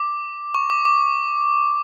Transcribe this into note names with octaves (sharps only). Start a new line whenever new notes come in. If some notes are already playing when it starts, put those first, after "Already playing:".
Already playing: D6
C#6
D6
D6